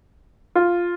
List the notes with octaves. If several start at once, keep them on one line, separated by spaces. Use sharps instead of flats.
F4